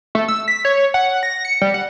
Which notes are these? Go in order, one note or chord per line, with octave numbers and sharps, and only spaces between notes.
A3
E6
B6
C#5
F#5
A#6
C#7
G3
F#5